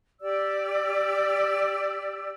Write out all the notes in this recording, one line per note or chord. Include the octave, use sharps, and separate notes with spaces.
G4 D5 E6